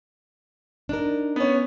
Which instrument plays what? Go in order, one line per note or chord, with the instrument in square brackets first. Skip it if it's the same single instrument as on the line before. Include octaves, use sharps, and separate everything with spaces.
[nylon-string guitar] D4 D#4 A#4
[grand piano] B3 C#4